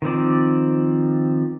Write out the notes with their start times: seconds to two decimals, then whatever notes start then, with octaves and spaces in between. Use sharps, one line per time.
0.02 D#3 F3 C4 D5